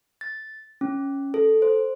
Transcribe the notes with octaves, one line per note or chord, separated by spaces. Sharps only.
A6
C#4
A4
C5